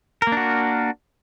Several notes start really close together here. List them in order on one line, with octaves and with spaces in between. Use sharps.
A#4 A#3 D4 F#4